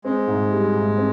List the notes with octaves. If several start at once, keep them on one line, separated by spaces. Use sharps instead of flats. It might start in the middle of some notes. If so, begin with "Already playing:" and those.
G#3 C4
G#2
G3
G#2
C4